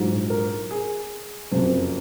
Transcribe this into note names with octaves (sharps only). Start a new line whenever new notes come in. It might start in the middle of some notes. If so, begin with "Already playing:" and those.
Already playing: A#1 G#2 F#3 G#4
A#4
G#4
F#1 F2 C#3